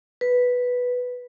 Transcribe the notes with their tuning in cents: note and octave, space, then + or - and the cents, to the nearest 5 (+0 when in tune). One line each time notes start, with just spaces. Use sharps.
B4 +0